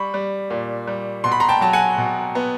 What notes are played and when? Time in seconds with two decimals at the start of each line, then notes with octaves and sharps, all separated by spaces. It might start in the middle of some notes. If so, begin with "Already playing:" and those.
Already playing: G3 B5 C#6
0.14 G3
0.50 A#2
0.87 G3
1.24 B2 C6
1.32 B5
1.40 A#5 C6
1.49 G5 A5
1.61 F#3 A5
1.73 F#5 G#5
1.98 B2
2.35 B3